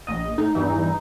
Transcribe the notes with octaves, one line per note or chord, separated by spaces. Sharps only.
A#1 D#5
A2 D#4
E2 G2 E3